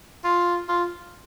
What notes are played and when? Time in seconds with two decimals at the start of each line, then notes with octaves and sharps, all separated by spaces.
0.24 F4
0.69 F4